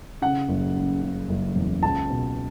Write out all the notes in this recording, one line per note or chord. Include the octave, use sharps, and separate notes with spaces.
C#3 F#5
F#1
C#3
C#3
F#1
E2
C#2 A5
B2